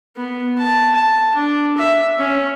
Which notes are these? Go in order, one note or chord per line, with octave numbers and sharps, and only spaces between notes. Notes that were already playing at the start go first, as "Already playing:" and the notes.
B3
A5
A5
D4
E5
C#4